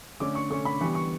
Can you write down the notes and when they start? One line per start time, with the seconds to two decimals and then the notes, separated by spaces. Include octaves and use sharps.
0.20 D3 A3 C#4 D6
0.35 C#6
0.50 D3 A3 C#4 C#6
0.65 B5
0.81 E3 G3 B3 C#6
0.95 C#6